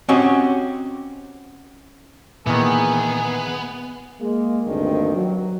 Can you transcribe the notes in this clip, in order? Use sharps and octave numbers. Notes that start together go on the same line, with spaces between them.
C4 C#4 F#4 G4 D#5
A#2 D#3 E3 B3 G#4
G#3 A#3 G#4
D2 G2 A#2 D#3 C4 D#5
F#3